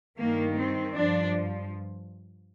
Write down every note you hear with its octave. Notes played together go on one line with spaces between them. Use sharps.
G2 D#3 A#3
C4
G2 F3 D4